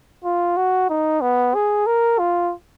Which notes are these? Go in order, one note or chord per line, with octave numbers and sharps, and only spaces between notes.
F4
F#4
D#4
B3
G#4
A#4
F4